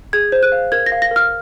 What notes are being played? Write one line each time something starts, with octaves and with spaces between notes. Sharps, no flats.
G#4 G#6
C5
F#6
F5
A#4 G#6
A#6
F5
A#6
A#4
F6